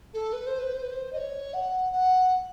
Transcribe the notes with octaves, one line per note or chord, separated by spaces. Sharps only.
A4
B4
C5
B4
C5
B4
C5
D#5
C#5
F#5
F#5